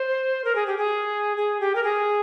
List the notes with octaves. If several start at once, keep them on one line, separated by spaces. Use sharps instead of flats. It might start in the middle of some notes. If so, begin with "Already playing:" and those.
Already playing: C5
A#4
G#4
G4
G#4
G#4
G4
A#4
G#4